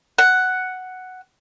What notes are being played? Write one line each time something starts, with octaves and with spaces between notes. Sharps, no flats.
F#5